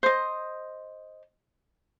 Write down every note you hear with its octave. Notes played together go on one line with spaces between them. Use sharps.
C5 D#5